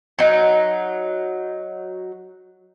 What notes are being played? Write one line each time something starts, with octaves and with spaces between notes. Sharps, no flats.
F#3 D#4